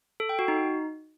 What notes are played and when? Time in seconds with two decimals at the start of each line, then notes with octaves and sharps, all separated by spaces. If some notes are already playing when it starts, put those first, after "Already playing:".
0.20 A4
0.29 G5
0.39 F#4
0.48 D#4